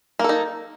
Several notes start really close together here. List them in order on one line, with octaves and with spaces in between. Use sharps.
A#3 A4 D#4